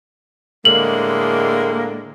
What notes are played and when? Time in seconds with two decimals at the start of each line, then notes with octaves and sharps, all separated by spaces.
0.65 A2 D3 G#3 A#3 F#7